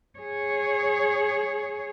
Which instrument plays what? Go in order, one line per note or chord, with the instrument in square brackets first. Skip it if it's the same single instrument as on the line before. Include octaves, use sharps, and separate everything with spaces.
[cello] G#4 C#5